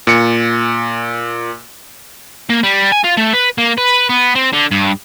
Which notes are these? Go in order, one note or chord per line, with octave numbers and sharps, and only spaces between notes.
A#2 C#7
A#3
G3
G#5
F4
A3
B4
A#3
B4
B3
C4
D3
G2